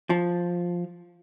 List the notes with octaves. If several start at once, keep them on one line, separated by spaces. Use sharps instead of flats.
F3